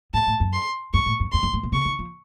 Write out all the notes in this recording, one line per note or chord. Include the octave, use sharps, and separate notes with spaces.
A2 A5
A2
F#2
C6
F#2 C#6
A2
F#2
F2 C6
F#2
A2
A#2
C3 C#6
D#3
F3